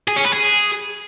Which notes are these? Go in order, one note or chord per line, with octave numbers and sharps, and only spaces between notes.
G#4
C#4
B4
G#4